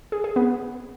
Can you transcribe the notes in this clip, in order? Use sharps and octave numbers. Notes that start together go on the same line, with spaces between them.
G#4
G#4
B3